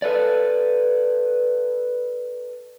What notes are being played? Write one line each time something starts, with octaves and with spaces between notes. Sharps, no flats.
A4 B4 D5